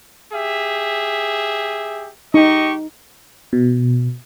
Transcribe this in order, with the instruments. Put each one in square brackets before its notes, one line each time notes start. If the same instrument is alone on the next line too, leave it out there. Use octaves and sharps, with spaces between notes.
[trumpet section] G4 G#4 E5
[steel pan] D#4 [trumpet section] G4 D#5 C#6
[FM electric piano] B2